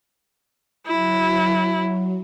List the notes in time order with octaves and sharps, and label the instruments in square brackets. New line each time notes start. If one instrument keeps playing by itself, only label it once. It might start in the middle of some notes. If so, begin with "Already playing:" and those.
[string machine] F#3 [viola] E4